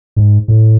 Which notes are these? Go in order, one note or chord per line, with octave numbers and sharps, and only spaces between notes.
G#2
A2